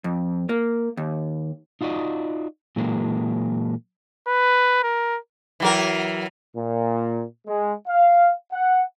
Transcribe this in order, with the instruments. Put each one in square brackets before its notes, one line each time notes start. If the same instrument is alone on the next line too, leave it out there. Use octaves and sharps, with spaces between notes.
[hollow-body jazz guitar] F2
A#3
D#2
[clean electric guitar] D#4 F4 F#4 D5 D#5
A#2 E3 F#3 G#3 A#3
[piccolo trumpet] B4
A#4
[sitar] E3 F#3 A#4
[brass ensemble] A#2
G#3
F5
F#5